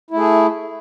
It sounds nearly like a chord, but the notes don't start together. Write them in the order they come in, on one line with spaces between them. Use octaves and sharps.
E4 A3 G#4